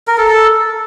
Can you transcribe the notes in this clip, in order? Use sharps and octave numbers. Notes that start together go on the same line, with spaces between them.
A#4
A4
A4